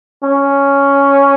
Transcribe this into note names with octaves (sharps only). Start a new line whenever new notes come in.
C#4